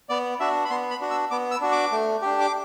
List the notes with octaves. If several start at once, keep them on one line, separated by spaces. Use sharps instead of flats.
B3 D5
D4 F#4 E5
B5
B3 C6
B5
D4 F#4
E6
B3 D6
E6
D4 F#4
D6
A3
D4 G4
D6